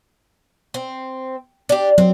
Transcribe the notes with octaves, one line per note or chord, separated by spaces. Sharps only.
C4
D4 G4
F#3 C4